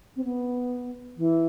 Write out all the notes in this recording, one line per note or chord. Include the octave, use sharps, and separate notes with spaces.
C4
B3
E3